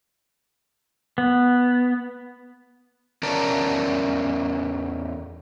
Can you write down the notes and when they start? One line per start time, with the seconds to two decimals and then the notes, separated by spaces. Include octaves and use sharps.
1.18 B3
3.23 E2 C#4 A#4 D5 A5 A#5